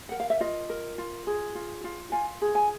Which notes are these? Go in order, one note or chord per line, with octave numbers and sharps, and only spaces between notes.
A#4 F#5
F5
E5
F4 D#5
A#4
F4
G#4
F4
F4
F4 G#5
G#4
G#5